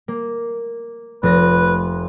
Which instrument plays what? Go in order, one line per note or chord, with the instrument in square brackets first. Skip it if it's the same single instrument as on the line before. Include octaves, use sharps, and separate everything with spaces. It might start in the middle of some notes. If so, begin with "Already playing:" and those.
[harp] A#3
[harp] F1 A#6 [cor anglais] B4